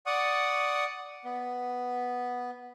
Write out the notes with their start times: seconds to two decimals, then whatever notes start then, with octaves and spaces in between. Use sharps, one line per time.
0.06 D5 F#5 C#6 D#6
1.25 B3